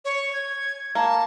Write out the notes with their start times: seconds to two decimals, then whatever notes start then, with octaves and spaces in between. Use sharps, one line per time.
0.05 C#5
0.33 G#6
0.95 A#3 A5